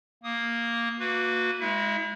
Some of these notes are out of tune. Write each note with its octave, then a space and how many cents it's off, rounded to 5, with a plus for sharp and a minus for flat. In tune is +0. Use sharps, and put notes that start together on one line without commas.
A#3 +0 D#6 +0
A#3 -15 F#4 -25 B4 +0
G#3 +0 E4 -30 E5 +35